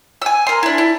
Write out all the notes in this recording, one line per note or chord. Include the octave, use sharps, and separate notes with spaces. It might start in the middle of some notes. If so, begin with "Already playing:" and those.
G#5 E6
A#4 C6
D4 E4
E4